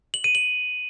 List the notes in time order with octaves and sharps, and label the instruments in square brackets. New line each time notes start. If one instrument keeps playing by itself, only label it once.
[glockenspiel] F#7
D#7
F#7